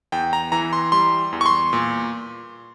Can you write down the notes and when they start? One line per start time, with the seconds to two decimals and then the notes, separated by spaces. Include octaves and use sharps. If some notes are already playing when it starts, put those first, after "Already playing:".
0.12 E2 G5
0.33 A#5
0.52 E3 A#5
0.73 C6
0.92 G3 C6
1.32 E2
1.41 C#6
1.46 C6
1.73 A#2